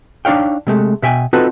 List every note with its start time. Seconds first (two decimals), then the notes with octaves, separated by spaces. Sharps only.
0.25 D4 D#4 C#5 F5 G5
0.67 C3 G#3 A3
1.03 B2 E5 G5 G#5
1.33 C4 D#4 F4 F#4 A4 B4